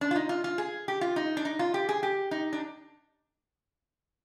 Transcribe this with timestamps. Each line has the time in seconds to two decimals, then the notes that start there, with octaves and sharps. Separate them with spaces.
0.01 D4
0.11 F4
0.16 D#4
0.29 F4
0.44 F4
0.58 G#4
0.88 G4
1.01 F4
1.16 D#4
1.37 D4
1.45 D#4
1.59 F4
1.74 G4
1.89 G#4
2.03 G4
2.31 D#4
2.53 D4